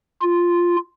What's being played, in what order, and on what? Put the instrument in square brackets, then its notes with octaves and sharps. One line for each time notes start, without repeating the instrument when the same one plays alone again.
[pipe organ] F4